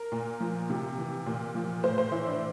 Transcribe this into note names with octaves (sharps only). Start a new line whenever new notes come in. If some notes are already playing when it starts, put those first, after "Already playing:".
Already playing: A#4
A#2
F3
C3
E3
A#2
F3
A2 C5
C5
E3 E4
D4